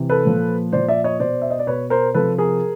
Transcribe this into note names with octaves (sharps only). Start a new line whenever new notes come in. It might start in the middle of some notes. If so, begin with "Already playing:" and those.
Already playing: C3 E3
A4 B4
A#2 F3
A#2 F3 C5 D5
D5 E5
C#5 D#5
B2 C5 D5
E5
D#5
D5
B2 B4 C#5
A#4 C5
C3 F3 A4 B4
G#4 A#4